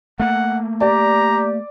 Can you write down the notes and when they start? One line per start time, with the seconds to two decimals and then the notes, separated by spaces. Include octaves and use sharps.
0.20 A3 A#3 F#5
0.81 G4 D5 A#5